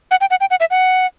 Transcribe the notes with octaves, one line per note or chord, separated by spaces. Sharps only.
F#5
G5
F#5
G5
F#5
E5
F#5